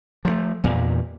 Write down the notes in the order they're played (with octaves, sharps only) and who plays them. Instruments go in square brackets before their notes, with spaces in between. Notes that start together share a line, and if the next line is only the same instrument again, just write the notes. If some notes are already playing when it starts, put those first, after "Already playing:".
[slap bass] F3 F#3 A3
E2 G2 A#2